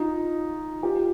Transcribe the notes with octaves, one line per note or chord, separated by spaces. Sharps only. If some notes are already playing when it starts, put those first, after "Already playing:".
Already playing: D#4 F4
F4 G4